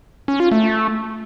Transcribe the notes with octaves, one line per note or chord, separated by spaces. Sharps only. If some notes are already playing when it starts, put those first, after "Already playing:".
C#4
F4
A3